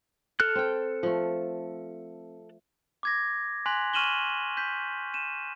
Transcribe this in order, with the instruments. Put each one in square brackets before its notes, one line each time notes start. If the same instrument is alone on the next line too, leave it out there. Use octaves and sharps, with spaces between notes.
[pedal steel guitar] A4 F6 F#6
[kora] C4 G5
F3 A3
[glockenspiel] D6 G#6 A#6
G#5 C6 F#6 B6 F7 F#7
C#6 F6 D#7 E7 F#7 G7
G6 B6
D#7 E7